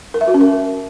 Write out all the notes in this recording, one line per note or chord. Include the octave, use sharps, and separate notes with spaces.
A#4
E5
F#4
C#4
A#4